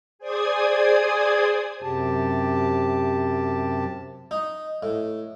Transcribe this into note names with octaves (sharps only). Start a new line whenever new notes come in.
G#4 C5 D5 G#5 D#6 G#6
F#2 C3 G4 A5
D#4
A2